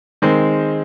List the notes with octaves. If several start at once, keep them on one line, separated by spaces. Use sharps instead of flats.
D#3 G#3 C4